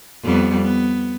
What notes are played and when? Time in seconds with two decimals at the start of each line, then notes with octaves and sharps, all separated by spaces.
0.25 F2 G3 B3
0.62 B3